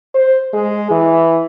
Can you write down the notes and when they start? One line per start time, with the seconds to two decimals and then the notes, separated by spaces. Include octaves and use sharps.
0.14 C5
0.53 G#3
0.91 E3